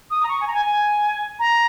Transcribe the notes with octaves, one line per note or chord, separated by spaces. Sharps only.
D#6
A#5
C#6
G#5
A#5
G#5
G#5
A#5